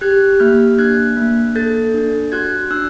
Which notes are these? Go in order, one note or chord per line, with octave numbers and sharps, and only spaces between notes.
G4 F#6 G#6
A#3 F6 G6
D4 F#6 G#6
A#3
A4 G6 A6
D4
F#4 F#6 G#6
D4 E6 F#6